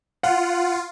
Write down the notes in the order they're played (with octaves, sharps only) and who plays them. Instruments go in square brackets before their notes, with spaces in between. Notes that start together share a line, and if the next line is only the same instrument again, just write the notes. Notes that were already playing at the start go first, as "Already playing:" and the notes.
[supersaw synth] F4 [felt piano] F#5